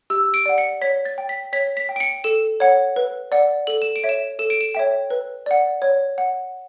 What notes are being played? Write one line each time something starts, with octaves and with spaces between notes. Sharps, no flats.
G4 E6
D7
D5 F#5
C#7
C#5 B6
A6
G5
B6
C#5 B6
B6
G5
D7
C#7
A4 E7
C#5 F#5
B4
D5 F#5
A4 F#7
E7
D7
C#5 E5
E7
A4 E7
D7
E7
C#5 E5 G5
B4
D5 F#5
C#5
F#5